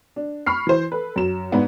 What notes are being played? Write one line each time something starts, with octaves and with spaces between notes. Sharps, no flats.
D4
B5 C#6 F6 C7
E3 C5
A4 B4
F#2 E7
G#2 B3 D4